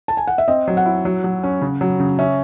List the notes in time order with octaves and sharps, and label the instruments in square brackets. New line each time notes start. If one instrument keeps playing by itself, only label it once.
[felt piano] A5
G#5
F#5
E5
[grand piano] C4 [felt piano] D#5
[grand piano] F#3
[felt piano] F#5
[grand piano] E4
F#3
F#3
C#4
C#3
F#3
C#3
[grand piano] C#4 [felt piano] E5